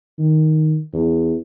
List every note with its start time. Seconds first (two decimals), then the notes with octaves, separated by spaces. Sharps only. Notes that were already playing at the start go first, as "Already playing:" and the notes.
0.19 D#3
0.93 E2